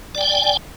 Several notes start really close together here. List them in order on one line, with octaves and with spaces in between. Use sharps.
D5 G5 G#5